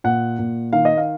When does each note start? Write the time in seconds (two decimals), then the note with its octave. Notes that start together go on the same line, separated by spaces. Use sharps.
0.04 A#2 F#5
0.39 A#2
0.73 D#3 F5
0.85 D#5
0.97 F5